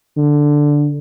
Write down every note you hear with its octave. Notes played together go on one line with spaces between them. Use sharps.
D3